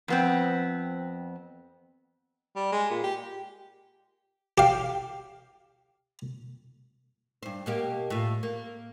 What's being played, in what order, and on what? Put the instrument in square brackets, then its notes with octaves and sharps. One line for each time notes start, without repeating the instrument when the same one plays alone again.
[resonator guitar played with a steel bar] F2 B3 C4
[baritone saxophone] G3
G#3
A#2
G4
[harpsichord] G4 F5
[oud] G2 C5
B2 A#3 G4
A2 F4
A#3